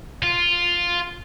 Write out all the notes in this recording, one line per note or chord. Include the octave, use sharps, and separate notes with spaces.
F4